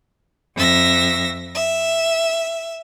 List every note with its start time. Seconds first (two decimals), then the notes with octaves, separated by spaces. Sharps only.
0.57 F2 E5 A#6
1.55 E5